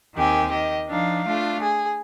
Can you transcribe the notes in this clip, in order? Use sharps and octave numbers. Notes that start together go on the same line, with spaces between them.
D#2 D#3 C4 G4 G#5
D#3 G4 D#5
F3 D4 D#4 F5
A3 D4 F4
G#4